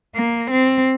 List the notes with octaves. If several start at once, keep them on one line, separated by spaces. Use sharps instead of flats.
A#3
C4